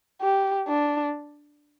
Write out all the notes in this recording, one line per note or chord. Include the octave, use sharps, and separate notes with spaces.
G4
D4